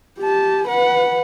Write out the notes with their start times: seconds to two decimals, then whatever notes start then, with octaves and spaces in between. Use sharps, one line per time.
0.19 G4 A5
0.68 B4 F#5